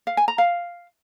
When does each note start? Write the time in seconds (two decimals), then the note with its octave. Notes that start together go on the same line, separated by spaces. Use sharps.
0.07 F5
0.17 G#5
0.28 A#5
0.38 F5